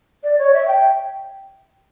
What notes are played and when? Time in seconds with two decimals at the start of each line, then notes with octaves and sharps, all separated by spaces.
0.24 D5
0.38 C#5
0.54 E5
0.68 G5